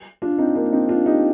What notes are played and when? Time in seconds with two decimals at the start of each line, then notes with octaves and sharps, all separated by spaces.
0.22 D4 F4
0.38 C4 D#4
0.55 A#3 D4
0.72 C4 D#4
0.88 D4 F4
1.06 D#4 G4